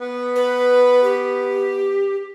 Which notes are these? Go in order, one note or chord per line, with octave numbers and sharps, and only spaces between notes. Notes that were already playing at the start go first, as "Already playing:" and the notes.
B3
B4
G4